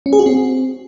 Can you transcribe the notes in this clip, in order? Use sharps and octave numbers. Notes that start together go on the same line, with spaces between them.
C#4
G#4
F#4
C4